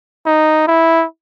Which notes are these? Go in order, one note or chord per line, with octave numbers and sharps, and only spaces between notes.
D#4
E4